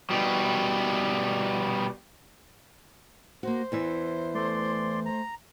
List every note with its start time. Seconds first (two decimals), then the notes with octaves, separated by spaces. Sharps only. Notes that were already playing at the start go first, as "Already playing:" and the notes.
0.10 B2 G3
3.43 A#3 F#4 C5
3.72 E2 E3 E5
4.35 A3 D5 C6
5.06 A#5